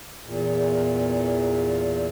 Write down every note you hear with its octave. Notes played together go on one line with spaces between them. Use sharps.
E2 A#2